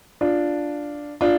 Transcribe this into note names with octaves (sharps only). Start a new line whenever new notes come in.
D4 F4
D4 F4